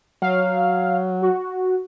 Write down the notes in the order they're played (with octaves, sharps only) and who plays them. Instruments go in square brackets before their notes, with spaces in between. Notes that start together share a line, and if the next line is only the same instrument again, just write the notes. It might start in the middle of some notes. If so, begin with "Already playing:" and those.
[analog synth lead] F#3 [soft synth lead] F5
[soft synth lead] F#4